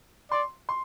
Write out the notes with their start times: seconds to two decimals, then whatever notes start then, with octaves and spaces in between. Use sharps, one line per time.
0.31 D5 C6
0.69 C6